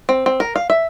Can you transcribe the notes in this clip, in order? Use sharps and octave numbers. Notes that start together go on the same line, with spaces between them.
C4
C4
A#4
F5
E5